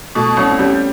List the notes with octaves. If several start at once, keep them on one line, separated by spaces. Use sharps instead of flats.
B2 A3
B3
C2 C#4
C4
G3 C#4